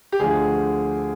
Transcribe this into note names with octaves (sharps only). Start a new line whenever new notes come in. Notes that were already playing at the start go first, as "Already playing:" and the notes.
G4
D2 D3 F3 G#4